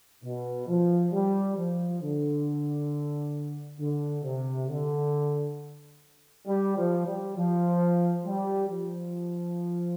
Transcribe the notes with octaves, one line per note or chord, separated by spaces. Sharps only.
B2
F3
G3
F3
D3
D3
C3
D3
G3
F3
G3
F3
G3
F3